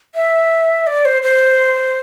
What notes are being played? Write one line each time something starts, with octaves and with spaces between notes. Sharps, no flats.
E5
D5
C5
C5